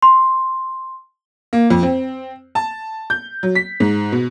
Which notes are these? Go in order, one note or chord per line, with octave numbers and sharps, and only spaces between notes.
C6
A#3
F2
C4
A5
G6
F#3
B6
G#2
B2